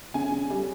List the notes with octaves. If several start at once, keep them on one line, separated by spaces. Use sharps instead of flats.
C#3 G#5
C#3
G3